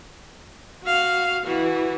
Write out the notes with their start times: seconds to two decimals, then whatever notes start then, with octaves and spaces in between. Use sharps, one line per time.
0.84 F#4 F5
1.46 E3 F#4